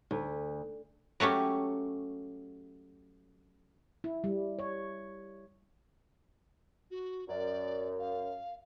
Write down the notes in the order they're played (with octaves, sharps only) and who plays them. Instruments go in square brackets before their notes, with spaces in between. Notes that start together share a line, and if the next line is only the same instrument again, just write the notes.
[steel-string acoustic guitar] D2
[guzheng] F#3 A3 C#4 G4
[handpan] E4
G3
C#5
[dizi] F#4
[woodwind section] F#2 [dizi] D5
[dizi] F5